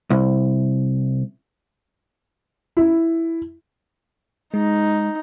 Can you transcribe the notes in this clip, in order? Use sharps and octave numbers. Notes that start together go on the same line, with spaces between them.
C2
E4
G#3 D#4